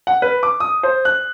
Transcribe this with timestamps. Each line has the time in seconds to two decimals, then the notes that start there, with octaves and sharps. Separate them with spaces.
0.07 F#5
0.22 B4
0.43 D6
0.60 D#6
0.83 C5
1.05 F#6